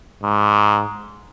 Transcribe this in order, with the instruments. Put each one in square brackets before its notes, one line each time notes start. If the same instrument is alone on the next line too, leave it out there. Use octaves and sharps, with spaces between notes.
[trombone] G#2